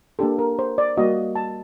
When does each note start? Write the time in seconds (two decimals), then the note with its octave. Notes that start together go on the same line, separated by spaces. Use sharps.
0.19 A#3 D4 G4 A4
0.39 A#4
0.59 C5
0.78 D5
0.97 G3 A#3 F#4 D#5
1.36 A5